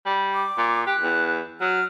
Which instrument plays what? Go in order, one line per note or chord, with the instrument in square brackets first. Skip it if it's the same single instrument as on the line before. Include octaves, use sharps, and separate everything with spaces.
[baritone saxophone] G3
[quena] D6
[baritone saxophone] A#2
[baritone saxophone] G4 [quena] F#6
[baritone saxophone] E2
[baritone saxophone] F#3 [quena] F6